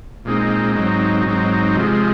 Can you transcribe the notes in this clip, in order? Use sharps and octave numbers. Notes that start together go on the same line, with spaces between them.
A#2 G#3 C4 D#4
G#2 F#3 C4 D#4
G#2 F#3 C4 D#4
C3 F3 G#3